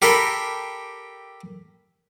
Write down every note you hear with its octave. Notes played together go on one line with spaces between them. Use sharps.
G4 A4 A#4 G5 B5 C6